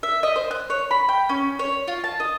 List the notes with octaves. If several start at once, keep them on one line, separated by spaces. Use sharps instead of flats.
E5
D#5
C5
F#6
C#5
B5
G5
C#4
C#5
F4
A5
D#5